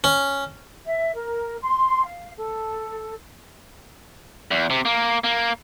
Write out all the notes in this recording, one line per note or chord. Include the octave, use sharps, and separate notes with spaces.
C#4
E5
A#4
C6
F5
A4
E2
C3
A#3
A#3